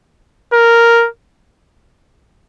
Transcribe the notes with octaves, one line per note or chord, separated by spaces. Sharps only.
A#4